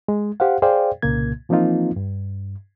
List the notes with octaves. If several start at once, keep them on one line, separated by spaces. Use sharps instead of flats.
G#3
G4 C5 F5 F#5
G#4 C5 D5 F5 G5
C2 A#2 C#3 A#3 G#6
E3 F3 A#3 C4 D#4 F4
G2